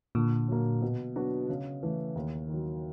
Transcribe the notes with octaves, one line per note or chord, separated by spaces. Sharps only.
A#2 D3
F#3 A#3
B2
F#3 B3 D4 F#4
C#3
E3 A3
D#2
D#3 F#3